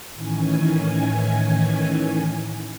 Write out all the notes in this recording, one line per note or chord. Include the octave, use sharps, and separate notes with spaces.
A2 D#3 E3 C#4 G#5